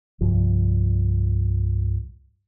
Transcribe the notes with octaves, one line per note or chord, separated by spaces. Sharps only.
C2 G2 F3